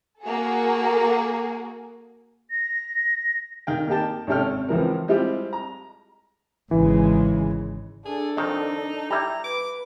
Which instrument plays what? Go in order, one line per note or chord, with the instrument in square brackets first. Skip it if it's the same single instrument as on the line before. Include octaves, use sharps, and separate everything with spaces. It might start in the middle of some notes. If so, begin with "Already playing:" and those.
[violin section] A#3 F#4 G#4 A4
[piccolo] A#6
[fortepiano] D#3 F5 G5
A#3 D#4 G4 G5 A5
G#1 C3 C#4 A4 G5 F6
C#2 E3 F3 A#4
G3 G#3 C4 E4 F4 G4
A#5
[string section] G#1 C#3 G#3 [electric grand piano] E3
[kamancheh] D4 A4 [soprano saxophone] G#4
[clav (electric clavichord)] F2 D#3 [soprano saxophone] D#4
[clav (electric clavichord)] G3 E4 G4 [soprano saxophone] A#5
[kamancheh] B4 [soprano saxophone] D6